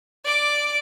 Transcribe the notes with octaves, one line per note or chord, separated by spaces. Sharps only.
D5 D6